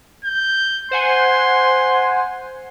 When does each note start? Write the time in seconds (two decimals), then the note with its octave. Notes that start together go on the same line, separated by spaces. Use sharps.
0.25 G6
0.91 C5 F#5 G#5 C6